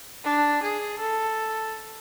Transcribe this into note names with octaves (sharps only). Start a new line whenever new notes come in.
D4
G#4
A4